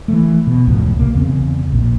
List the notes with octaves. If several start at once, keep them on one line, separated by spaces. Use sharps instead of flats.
E3 F3 A3
B2
F1 C#2 A2 F3
B1 C3 A#3
E2 C#3 C4
A#1 A#2